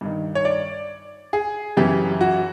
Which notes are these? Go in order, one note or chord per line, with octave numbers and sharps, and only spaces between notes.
G2 D#3
C#5
D5
G#4
F#2 C#3 E3 G4
F#4